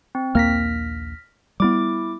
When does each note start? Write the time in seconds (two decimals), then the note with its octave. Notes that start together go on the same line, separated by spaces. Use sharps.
0.15 C4
0.35 A#1 D#2 A#3 F6 A#6 B6
1.60 G3 B3 E4 D6